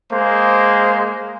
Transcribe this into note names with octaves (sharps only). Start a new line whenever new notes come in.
G#3 A#3 C5